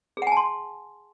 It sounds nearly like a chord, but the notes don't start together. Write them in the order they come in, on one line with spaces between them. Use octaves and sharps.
G#4 F#5 G#5 A5 C6